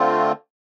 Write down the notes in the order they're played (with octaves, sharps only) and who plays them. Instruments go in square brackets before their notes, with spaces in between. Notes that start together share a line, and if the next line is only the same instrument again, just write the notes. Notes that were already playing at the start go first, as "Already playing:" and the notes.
Already playing: [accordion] D3 A3 C4 F4